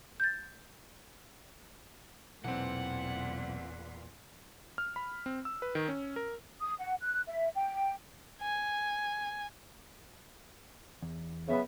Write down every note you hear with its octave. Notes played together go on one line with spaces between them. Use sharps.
G6 A6
B1 E2 A#2 E3 C4 F#5
F6
B5
C4
E6
B4
D#3
C#4
A#4
D#6
F#5
F#6
E5
G5
G#5
E2
C#3 F#3 B3 E5